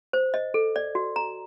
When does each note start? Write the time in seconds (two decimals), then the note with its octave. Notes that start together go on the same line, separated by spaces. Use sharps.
0.13 C5
0.34 D#5
0.54 A4
0.76 D5
0.95 F#4
1.16 A#5